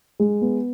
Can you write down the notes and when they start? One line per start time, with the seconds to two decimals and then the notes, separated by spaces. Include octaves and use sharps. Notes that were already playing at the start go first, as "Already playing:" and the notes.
0.20 G#3
0.42 B3